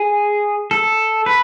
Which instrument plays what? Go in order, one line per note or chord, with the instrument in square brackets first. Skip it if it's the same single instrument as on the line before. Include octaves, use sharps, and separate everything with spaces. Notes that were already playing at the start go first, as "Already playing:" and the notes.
Already playing: [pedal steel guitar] G#4
A4
B4